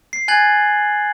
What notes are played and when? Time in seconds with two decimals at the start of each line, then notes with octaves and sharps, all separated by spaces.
0.13 C7
0.28 G#5 F#6 G#6 A6 F#7